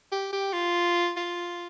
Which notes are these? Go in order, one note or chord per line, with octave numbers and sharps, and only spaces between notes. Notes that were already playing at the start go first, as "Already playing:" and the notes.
G4
G4
F4
F4